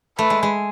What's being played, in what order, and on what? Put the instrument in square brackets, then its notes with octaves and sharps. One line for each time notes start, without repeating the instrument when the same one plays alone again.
[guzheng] A3 [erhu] B4
[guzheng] G#3
G#3